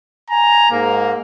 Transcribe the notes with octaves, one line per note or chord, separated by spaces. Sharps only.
G#5 A#5
G#2 A#3